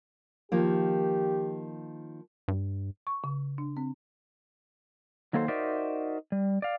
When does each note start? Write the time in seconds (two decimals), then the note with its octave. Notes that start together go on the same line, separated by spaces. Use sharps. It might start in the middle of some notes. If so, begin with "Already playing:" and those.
0.52 D#3 F3 A#3 G4
2.48 G2
3.07 C#6
3.24 C#3
3.58 D4
3.77 C4
5.33 D#3 F#3 A#3 A4 A#4 C5
5.48 D#4 F#4 A#4 C5 D5 E5
6.32 G3
6.62 D5 F5